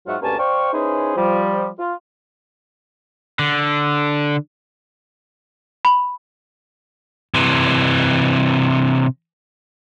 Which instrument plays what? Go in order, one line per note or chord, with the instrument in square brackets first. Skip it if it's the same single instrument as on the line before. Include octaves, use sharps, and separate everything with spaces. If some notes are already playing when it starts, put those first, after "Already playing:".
[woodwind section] G#2 F#3 F4 E5 F#5 C#6
D2 G2 A#3 C#4 G#5 A5
C5 D5 F5 G5 C#6
C#4 D#4 E4 G#4 B4 C5
F3 G3
F4
[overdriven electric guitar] D3
[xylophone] B5
[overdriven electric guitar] C3 E3